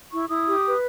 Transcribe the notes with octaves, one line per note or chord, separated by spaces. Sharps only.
E4 C#6
E4 D#6
G4
B4